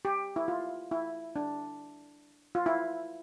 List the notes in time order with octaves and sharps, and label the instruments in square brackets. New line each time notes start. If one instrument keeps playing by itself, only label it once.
[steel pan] G4
E4
F4
E4
D4
F4
E4